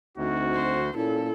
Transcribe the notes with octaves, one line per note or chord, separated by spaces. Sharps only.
D2 C4 D#4 F#4
C5
A#2 C#4 E4 A4